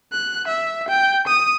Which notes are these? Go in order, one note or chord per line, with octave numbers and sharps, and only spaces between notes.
F#6
E5
G5
D#6